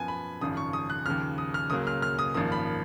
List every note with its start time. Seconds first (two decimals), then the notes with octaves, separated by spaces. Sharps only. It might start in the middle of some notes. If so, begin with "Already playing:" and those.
Already playing: F#2 F3 B3 G#5
0.08 B5
0.41 G#1 F#2 C#3 F3 D#6
0.57 C#6
0.73 D#6
0.90 F#6
1.06 D#2 C#3 F3 F6
1.38 D#6
1.54 F6
1.70 C#2 C#3 F#3 A#3 D#6
1.87 F6
2.02 F6
2.19 D#6
2.34 G#1 F#2 F3 A#3 D#6
2.52 B5